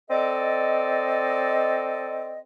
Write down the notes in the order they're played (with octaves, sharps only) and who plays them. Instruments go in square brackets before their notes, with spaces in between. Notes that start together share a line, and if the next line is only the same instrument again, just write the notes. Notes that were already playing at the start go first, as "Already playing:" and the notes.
[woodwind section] C4 A4 D5 D#5